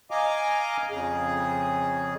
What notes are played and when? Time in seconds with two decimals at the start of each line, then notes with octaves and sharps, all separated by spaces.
0.11 D#5 F5 G#5 A#5 D6
0.90 F2 C#3 G#4